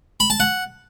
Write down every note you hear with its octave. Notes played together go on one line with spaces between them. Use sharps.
B5
A5
F#5